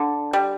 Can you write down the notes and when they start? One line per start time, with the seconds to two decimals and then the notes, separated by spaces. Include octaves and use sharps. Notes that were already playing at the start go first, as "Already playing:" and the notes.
Already playing: D3
0.33 G3